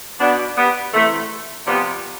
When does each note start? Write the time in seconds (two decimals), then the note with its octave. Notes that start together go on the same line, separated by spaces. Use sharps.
0.20 B2 B3 D4
0.57 G3 B3
0.93 C3 E3 A3
1.66 C3 F3 G3 B3